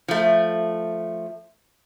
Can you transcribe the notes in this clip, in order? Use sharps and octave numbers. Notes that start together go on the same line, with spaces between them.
F3 A3